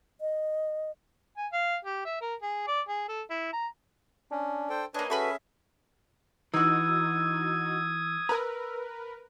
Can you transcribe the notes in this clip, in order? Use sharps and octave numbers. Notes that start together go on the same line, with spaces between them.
D#5
G#5
F5
G4
E5
A#4
G#4
D5
G#4
A4
E4
A#5
C#4 D4
A4 C5 G5
A#3 D4 B4 C#5 D#5 G#5
C#4 F#4 G#4 A4 B4 E5 B5 C#6
E3 D#4 F#4 D#6 E6 G#6
A#4 B4 A#5